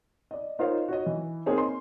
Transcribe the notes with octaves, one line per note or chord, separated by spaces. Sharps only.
D5 D#5
D#4 F4 A#4 C5 C#5 F5
F#4 C#5 D#5
E3
A#3 C4 D#4 G#4 C5 C#5
C6